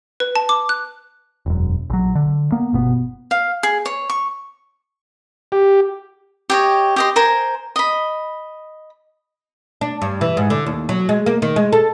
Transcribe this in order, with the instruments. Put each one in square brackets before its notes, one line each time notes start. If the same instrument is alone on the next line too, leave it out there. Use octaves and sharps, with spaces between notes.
[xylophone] B4
A5
D6
F#6
[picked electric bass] E1 F#2
A#1 F#3
D3
A#3 B3
G1 B2 B3
[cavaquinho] F5
G#4
C#5
C#6
[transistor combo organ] G4
[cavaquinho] G4 C#5 D#5
G4 D#5 C6
A#4 C5 G#5
D#5 B5
[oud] D4
G2
E3
G#2
D3
D#2
F#3
G#3
A#3
D#3
G#3
A4